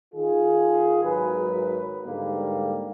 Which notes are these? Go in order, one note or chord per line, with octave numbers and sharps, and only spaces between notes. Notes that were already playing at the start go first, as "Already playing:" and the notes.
D#3 F4 G#4
G#1 F#3 A#4 B4
G#2 D3 G3 A#3